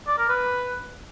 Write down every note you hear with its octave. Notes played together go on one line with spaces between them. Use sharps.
D5
A#4
B4